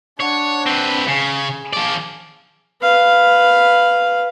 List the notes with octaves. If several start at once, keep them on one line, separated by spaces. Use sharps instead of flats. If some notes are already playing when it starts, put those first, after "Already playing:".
D4 C#5 F#5
C4 B4
C#3 G#4
F3 D5
B4 F5